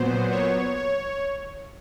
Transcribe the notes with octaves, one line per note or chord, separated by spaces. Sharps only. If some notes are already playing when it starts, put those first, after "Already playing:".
Already playing: A#2 F#3 B3 C5
C#5
C#5